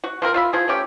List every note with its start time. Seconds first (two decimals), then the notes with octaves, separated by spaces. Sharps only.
0.04 F#4
0.22 F3 C4 A#4
0.34 F4 E5 B5
0.53 F3 G#4
0.68 A3 C#4 G4